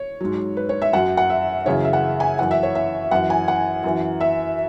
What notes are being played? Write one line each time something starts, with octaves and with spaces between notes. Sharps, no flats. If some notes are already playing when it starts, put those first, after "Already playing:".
Already playing: C#5
G#2 F#3
B4
C#5
E5
F#2 F#3 F#5
F#5
E5
F#2 C#3 E3 C#5
E5
F#5
G#5
F#2 E3 F#5
E5
C#5
E5
F#2 E3 F#5
G#5
F#5
F#2 E3
E5